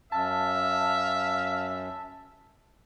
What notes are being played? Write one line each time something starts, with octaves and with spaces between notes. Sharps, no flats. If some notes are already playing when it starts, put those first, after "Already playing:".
F#2 E5 F5 A5